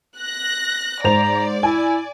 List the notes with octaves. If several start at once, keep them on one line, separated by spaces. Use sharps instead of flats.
F#6 A#6
G#2 C5 D5 A#5 F7
E4 G#5